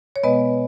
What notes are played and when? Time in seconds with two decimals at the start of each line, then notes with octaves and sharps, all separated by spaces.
0.16 C#5
0.24 B2 G#3 B3 B4 D#5